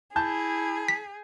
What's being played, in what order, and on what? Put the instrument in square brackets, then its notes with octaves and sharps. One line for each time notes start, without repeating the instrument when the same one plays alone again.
[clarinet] E4 [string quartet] G#4 [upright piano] A5 G6
[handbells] B6